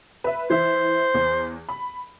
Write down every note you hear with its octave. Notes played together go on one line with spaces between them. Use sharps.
B4 E5
E3 C5 E5
E2
B5